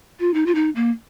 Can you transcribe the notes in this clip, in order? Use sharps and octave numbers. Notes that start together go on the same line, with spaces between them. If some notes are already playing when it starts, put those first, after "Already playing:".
F4
D#4
F4
D#4
A#3